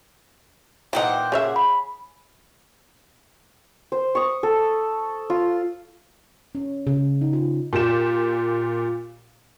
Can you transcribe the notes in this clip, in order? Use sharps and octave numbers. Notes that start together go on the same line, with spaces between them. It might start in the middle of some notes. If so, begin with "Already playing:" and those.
A#2 E3 D#4 C5 F#5 G5
C#3 G#4 C#5 E5
B5
C5
C#6 D#6
A4
F4
C#4
C#3
D#4
F4
A#2 G4 E7